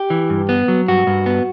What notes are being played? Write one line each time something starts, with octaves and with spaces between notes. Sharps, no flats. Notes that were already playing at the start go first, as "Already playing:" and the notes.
Already playing: G4
E3
G2
B3
F#3
G2 F#4
G2
B3